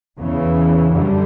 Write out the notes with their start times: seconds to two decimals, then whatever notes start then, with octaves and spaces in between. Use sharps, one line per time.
0.17 E2 C#3 E3
0.91 F#2 D3 G3